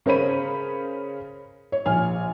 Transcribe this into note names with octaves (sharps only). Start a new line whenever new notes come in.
C#3 A#4 C5 C#5 B5 D#7
C#5
A#1 G#5 F6